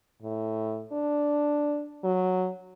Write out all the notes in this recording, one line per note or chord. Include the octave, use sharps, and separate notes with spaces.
A2
D4
F#3